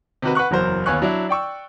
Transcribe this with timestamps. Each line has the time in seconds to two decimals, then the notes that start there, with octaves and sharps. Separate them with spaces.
0.22 C3 D#3 F#4 B4
0.35 B4 F#5 C#6 F#6
0.51 F#1 E2 F#3 A#4 C5
0.86 D#2 B3 C#5 G#5 C#6 F#6
1.02 F#3 D4 E4
1.29 D5 G5 C#6 E6